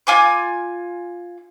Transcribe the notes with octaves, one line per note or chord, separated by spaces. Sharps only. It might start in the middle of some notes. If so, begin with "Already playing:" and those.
F4 G#5 D6